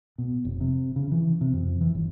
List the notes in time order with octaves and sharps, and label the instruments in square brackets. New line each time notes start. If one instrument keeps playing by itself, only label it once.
[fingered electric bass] B2
F1
C3
C#3
E3
C3
F2
E3
G1